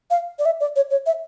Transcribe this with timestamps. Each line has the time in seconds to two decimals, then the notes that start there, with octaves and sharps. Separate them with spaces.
0.10 F5
0.39 D5
0.45 E5
0.60 D5
0.76 C#5
0.91 C#5
1.06 E5